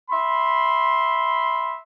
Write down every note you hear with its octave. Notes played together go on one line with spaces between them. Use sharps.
E5 B5 C6